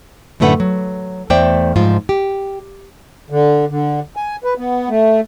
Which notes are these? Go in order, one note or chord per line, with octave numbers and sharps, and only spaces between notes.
F#2 A2 D3 A3 B4 F#5
F#3
E2 A3 C5 D5 E5 G5
G#2 F3 F4
G4
D3
D3
G#5
B4
B3
A3